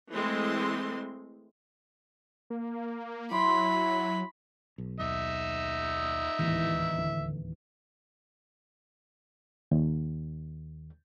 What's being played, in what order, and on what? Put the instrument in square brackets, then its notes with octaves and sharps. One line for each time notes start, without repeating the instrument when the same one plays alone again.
[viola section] E3 G#3 A3 C4 E4 C6
[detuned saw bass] A#3
[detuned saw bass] F#3 [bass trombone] E4 [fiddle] B5 [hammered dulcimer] C6 D6
[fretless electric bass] B1
[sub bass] D#2 [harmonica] D#4 E5
[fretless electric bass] D1 D#2 G#2 [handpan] E3
[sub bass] D3
[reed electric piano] D#2